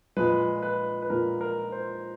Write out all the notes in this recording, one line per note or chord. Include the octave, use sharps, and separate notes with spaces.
A#2 F3 G#3 B4
B4
B4
A#2 F3 G#3 A#4
A#4
C5